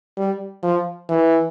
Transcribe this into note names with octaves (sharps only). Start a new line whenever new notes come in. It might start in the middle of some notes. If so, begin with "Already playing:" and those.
G3
F3
E3